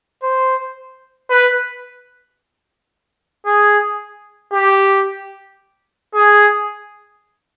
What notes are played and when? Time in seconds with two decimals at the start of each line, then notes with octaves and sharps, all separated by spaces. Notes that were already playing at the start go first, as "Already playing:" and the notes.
0.23 C5
1.31 B4
3.46 G#4
4.53 G4
6.14 G#4